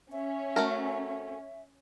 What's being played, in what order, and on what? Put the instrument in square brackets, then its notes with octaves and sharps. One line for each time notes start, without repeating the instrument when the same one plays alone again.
[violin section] C#4 [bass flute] E5
[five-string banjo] A3 F#4 A#4